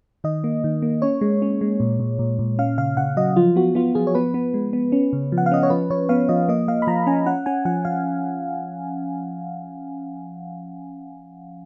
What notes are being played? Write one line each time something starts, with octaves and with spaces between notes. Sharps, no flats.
D#3 D#5
A#3
D#3
A#3
C#4 C#5
G#3
C#4
G#3
A#2
A#2
A#2
A#2
C#4 F5
C#3 F5
C#3 F#5
F#3 D#5
F3 F4
B3 F#4
B3 F4
F3 G#4
C#5
B3 B4
B3
G#3
B3
C#4
C#3
F3
F#5
F5
C#4 D#5
C#5
F3 B4
F3 C#5
B3 F5
F3 D#5
A#3 D#5
A#3 F5
B5
F3 A#5
C#4 G#5
C#4 F#5
C#4 G#5
F3 F#5
F3 F5